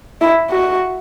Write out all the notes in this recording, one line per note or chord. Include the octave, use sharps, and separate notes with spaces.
E4
F#4